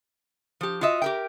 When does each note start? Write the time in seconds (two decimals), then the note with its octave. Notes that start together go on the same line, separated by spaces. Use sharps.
0.61 F3 G4
0.81 F4 F#4 D#5 E5
1.02 G4 A#4 G5